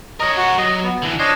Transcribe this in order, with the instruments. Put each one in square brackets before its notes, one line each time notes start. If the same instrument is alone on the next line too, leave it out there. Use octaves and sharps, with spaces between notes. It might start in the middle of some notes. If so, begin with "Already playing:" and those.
[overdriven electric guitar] A#4 C#5 [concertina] D#5
[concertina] F#4 F#5
[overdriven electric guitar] F#3 [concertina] D#5
[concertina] B3
[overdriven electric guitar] D3 E3
[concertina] D4 C#5 D#5 [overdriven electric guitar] C5 A5